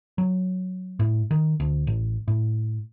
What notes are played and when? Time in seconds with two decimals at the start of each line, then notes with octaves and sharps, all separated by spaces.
0.18 F#3
0.99 A2
1.31 D#3
1.60 D2
1.87 A1
2.28 A2